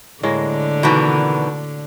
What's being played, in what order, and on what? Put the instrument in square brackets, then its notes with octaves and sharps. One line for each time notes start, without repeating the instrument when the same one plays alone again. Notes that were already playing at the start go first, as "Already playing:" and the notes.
[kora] A2 G#3 A#3 [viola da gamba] D3
[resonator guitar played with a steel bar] B2 D#3 E3 [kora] D4 F#4